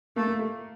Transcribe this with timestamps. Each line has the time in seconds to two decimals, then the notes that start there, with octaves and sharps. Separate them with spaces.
0.16 A3 A#3
0.27 A#3
0.39 A3